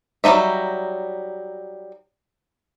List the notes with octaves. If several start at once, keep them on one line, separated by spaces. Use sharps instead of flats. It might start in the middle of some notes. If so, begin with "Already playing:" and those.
F#3 G3 C4 D#4 E5